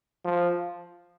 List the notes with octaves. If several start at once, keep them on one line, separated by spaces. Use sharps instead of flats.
F3